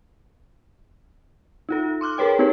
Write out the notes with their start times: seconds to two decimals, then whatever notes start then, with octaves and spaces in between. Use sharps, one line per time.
1.69 D#4 F4 A4
2.01 C6 D6 F6 F#6
2.18 G#4 A#4 B4 C#5 G5
2.39 C4 D#4 G4 G#4 B4 C#5